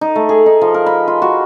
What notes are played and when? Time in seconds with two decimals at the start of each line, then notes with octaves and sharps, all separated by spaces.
0.01 D#4
0.16 A3
0.29 G#4
0.46 D#4
0.61 F3
0.74 A#4
0.86 B5
1.08 F4
1.22 F#4